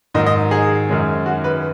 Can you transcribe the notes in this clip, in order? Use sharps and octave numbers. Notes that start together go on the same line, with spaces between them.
G#2 D#3 F#3 D#4 D#5
D#5
G#4
F#2 D#3 G#3 C#4
F#4
B4